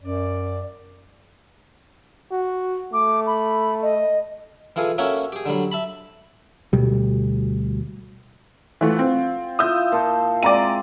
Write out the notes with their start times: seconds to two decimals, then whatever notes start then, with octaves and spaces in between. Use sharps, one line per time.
0.03 F#2 D5
2.31 F#4
2.93 A3 D6
3.27 B5
3.82 D#5
4.76 E3 F4 G#4 A4
4.98 A#3 C#4 F#4 A4 C#5 E5
5.32 G4 G#4
5.46 D3 F#3 G3
5.72 E5 A5 B5
6.73 D2 B2 G3
8.81 E3 A3 F4 F#5
8.99 C4
9.59 E4 F4 D#6 E6 G6
9.92 A#2 C5 A5
10.43 G#3 C4 D5 A#5 D#7